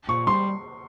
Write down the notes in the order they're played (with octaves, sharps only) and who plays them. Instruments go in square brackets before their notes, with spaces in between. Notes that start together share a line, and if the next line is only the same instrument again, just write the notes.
[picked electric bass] A#2 [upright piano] C#6
[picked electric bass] G3 [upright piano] C6